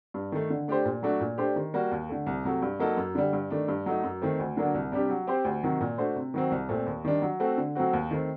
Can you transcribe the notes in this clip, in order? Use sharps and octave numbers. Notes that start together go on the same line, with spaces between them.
G2
D#3 A3
D3
A3 D4 G4 C5
A#2
F#3 A3 D4 F#4
A#2
A3 D4 G4 C5
D#3
G3 A#3 F#4
D#2
D3 A3
C2
C3 F#3 A3
G2
F#3 A#3 D#4 A4
F#2
D3 G3
G2
D#3 A3 D4
G2
F#3 A3 D#4
F#2
D#3 A3 C4
D2
D3 F#3 A#3 D4
C2
C3 G3 D4 G4
F#3
C4 G4 C5
D2
C3 D#3 F#3
A#2
A3 D4 F#4 C5
C3
D#3 F#3 C4
C2
A#2 A3 C4
D#2
D#3 G3 D4
F#3
A3 C4 F#4 A4
D3
F#3 A3 C4 F#4
D#2
D#3 A3 C4